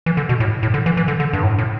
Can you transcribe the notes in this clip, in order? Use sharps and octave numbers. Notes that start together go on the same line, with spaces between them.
E3
D3
B2
A2
A2
D3
E3
E3
D3
D3
G2
A2
A2